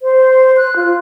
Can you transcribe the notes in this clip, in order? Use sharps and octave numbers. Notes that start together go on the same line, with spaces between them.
C5
F#6
F4